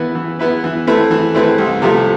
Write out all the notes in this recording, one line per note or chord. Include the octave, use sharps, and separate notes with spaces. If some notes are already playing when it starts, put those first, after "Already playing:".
Already playing: E3 B3 E4 B4
E3
B3 E4 B4
E3
A3 C4 E4 B4
E3
A3 C4 E4 B4
C2
C3 F3 A3